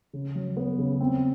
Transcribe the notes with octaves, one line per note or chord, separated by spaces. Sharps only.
C#3
F#3
B3
C#3
C4